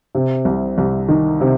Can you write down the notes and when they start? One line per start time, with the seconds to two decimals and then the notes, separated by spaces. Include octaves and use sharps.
0.15 C3
0.45 C2
0.78 C2
1.08 D#3
1.41 C3